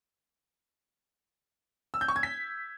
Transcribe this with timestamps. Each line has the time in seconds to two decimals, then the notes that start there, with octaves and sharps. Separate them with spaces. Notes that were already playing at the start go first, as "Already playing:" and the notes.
1.94 E6
2.01 G6
2.08 C#6
2.16 G#6
2.23 B6